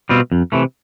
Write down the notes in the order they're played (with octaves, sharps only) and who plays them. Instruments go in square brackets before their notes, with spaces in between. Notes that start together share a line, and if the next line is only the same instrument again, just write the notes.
[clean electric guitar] B2 G3 C4 F4
F2
C3 E3 A3